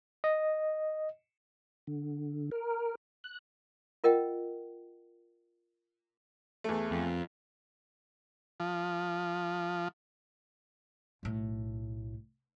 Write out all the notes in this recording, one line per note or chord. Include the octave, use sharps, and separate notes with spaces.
D#5
D3
A#4
F#6
F4 A#4 D#5 F#5 G5
E2 A3
F2
F3
B1 A2